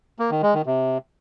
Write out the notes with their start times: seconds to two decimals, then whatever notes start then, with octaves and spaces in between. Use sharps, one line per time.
0.19 A#3
0.31 D#3
0.43 G#3
0.54 D#3
0.66 C3